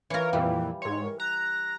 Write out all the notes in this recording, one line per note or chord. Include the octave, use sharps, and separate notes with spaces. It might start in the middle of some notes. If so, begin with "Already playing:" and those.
E3 F4 A#4 C#5
F2 A#2 E3 G3 G5
G#2 C#5 C6
A#4
A#5 F#6